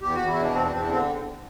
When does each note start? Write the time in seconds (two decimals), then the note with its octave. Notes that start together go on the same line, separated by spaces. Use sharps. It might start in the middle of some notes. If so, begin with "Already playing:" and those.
0.02 E2 G4
0.15 E2 F#4
0.28 E4
0.36 B2 D4
0.54 E2 C4
0.63 D4
0.72 E2 C4
0.81 D4
0.89 D3 C4